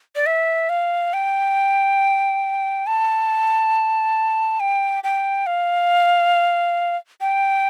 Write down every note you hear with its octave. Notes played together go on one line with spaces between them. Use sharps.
D5
E5
F5
G5
A5
G5
G5
F5
G5